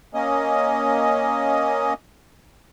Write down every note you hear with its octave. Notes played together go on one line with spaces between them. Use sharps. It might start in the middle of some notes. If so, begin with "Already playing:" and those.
A#3 C#4 D#5